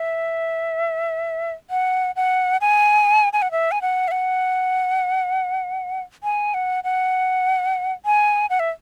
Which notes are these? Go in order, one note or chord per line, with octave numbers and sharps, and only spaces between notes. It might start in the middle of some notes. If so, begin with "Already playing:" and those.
Already playing: E5
F#5
F#5
G#5
G#5
F#5
E5
G#5
F#5
E5
F#5
G#5
F#5
F#5
G#5
F#5
E5